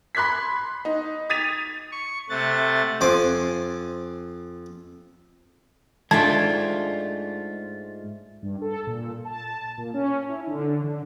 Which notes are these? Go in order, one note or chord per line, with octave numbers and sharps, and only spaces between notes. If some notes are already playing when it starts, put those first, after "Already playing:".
B5 C6 F#6 G#6 B6
D#4
D#6 G#6 A6 B6 D#7 F7
C#6
C3 A3 F#5 A6
F2 C5 G#5 D6
G#2 A3 D4 F4 G5 A5 G#6
G2
A4
A#2
A5
A#2
C#4
E4
D3
D3